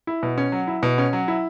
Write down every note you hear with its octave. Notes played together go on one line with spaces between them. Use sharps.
E4
B2
C#4
F#3
E4
B2
C#4
F#3
E4